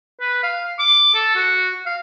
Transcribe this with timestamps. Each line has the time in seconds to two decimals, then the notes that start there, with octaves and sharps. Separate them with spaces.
0.20 B4
0.43 F5
0.79 D6
1.14 A4
1.35 F#4
1.86 F5